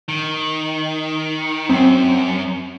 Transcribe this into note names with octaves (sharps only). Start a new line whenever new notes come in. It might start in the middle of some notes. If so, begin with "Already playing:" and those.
D#3
F#2 C4